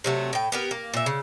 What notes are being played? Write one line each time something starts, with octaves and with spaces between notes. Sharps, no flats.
C3 F#3 A3
A2 G5
B3 G4 A#4
A#3
A#2 E5
C#3